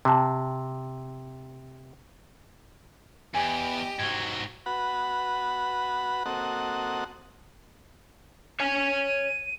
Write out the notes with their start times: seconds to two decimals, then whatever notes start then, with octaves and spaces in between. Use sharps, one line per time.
0.05 C3 G5 A5
3.34 E2 G4 D#5 G#5
3.99 G#2 F#3 G#6
4.66 F#4 B4 F#5 B5
6.26 A#3 C4 F#4 A4 D#5 F#5
8.60 C#5 G#5 D#7